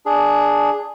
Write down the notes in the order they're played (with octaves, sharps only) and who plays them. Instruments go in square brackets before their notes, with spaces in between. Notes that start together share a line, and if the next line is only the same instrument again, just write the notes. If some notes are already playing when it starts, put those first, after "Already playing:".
[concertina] D4 G#4